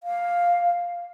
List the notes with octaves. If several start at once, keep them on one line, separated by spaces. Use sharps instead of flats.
F5